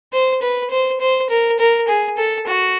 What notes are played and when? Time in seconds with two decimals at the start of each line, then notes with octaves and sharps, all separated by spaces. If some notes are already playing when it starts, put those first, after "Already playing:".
0.13 C5
0.42 B4
0.71 C5
1.00 C5
1.30 A#4
1.59 A#4
1.88 G#4
2.18 A4
2.47 F#4